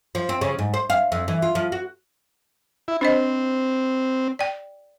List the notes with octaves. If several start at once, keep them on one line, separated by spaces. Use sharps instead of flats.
F3
C4
C#3
G#2
C5
F5
F2
E3
F4
F3
F#4
E4
C4 D4 C5 D#5
D5 G5